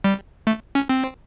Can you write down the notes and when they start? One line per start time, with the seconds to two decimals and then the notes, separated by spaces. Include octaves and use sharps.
0.04 G3
0.47 A3
0.75 C#4
0.89 C4